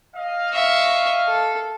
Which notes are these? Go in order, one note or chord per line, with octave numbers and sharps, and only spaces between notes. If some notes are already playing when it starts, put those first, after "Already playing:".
D#5 F5
E5 C#6
A4